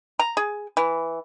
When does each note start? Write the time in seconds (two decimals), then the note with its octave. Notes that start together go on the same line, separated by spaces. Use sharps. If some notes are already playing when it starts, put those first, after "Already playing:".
0.19 A#5
0.37 G#4
0.77 E3